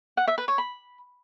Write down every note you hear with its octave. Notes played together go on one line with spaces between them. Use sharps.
F#5
E5
B4
C#5
B5